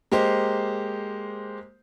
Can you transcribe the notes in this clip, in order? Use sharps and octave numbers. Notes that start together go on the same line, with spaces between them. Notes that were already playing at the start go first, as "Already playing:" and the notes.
G#3 A#3 G4 C5